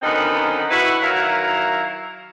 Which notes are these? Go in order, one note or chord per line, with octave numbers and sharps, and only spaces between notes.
F#2 D3 D#3 B3 C4 D#4
E4 F#4 B4
D#3 F#3 E4 A#4 F5